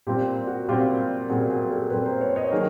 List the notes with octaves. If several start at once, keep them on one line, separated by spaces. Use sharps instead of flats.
A#2 G3 C4 F4 G4
F#4
A#2 G3 C4 F4 G4
A#2 G3 C4 F#4 G#4
F#4 G#4
G4 A4
A#2 G3 C4 A4 B4
A#4 C5
B4 C#5
C#5 D#5
D#3 F#3 A#3 G#4 A#4